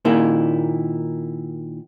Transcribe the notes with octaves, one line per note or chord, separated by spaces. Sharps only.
A#2 D#3 A#3 E4